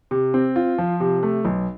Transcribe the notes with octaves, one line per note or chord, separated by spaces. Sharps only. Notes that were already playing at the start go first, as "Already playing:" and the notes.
C3
C4
F4
F3
C3
A3
B1